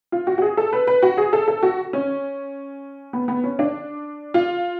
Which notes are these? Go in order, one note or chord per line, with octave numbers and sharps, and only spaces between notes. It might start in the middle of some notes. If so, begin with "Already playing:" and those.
F4
F#4
F#4
G#4
A4
B4
B4
F#4
G#4
A4
A4
F#4
C#4
B3
B3
C#4
D4
F4